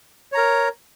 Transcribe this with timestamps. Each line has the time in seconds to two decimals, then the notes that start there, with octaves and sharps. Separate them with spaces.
0.32 C#5
0.35 A#5
0.37 A#4